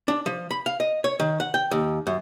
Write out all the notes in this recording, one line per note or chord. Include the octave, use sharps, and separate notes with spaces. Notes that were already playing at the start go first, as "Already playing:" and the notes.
D4
F3
B5
F5
D#5
C#5
D#3
F#5
G5
D#2
F#2